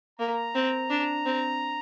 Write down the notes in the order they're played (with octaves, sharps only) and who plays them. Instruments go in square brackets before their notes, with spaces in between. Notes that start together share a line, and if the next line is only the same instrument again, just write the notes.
[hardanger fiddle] A#3 [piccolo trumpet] A#5
[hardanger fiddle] C4
D4
C4